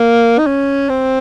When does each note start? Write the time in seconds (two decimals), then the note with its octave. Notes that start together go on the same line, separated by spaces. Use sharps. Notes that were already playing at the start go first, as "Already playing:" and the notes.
Already playing: A#3
0.39 D#4
0.47 C#4
0.89 C4